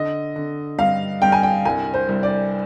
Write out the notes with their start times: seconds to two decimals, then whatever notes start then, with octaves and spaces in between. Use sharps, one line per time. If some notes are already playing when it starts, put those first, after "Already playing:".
Already playing: D3 D#5
0.36 D3
0.79 G2 F5
1.22 G2 G5
1.32 G#5
1.43 G5
1.65 C2 G#5
1.94 C5
2.09 C2
2.23 D5